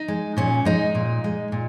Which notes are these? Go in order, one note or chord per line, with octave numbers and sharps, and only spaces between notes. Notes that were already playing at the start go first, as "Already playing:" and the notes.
Already playing: D#4
G#3
A#2 C#4
G#3 D#4
A#2
G#3
A#2